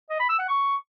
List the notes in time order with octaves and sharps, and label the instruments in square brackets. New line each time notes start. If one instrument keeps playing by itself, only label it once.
[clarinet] D#5
B5
E6
F#5
C#6